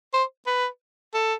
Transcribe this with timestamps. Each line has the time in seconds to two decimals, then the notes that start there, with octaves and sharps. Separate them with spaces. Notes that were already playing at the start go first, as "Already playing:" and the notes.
0.13 C5
0.47 B4
1.14 A4